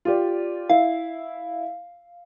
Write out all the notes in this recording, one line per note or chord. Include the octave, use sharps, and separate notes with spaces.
F4 G4 D5
E4 F5